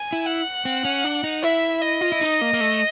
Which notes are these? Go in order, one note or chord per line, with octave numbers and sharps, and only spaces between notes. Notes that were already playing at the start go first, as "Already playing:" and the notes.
Already playing: G#5
E4
F#5
C4
C#4
D4
D#4
E4 E5
D#5
F4
E4
D#4
A#3
A#3
A3